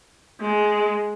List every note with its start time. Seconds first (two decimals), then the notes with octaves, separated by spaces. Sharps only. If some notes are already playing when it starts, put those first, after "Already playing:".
0.41 G#3